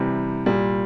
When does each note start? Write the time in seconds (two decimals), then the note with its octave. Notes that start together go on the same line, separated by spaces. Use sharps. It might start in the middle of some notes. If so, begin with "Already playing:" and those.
Already playing: C3 E3 G3
0.46 A#2 G3